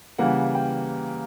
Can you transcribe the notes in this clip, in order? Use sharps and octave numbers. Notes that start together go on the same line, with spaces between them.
C#3 E3 G3 A#3 F#5
G5